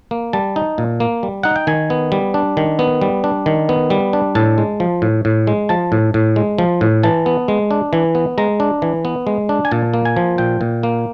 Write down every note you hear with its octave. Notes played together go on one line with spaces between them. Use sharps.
A#3
G3 A5
D#4
A#2
A#3
G3
D#4 F#5
G5
D#3 G#5
B3
G3
D4
D#3
B3
G3
D4
D#3
B3
G3
D4
A2 A5
G#3
F3
A2
A2
G#3
F3 A5
A2
A2
G#3
F3
A2
E3 A5
B3
G#3
D4
E3
B3
G#3 A#5
D4
E3
B3
G#3
D4
G#5
A#2 A5
A#3
G#5
F3
A#2 G5
A#2
A#3